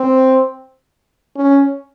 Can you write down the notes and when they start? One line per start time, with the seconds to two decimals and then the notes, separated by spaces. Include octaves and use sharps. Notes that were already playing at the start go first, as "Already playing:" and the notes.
Already playing: C4
1.37 C#4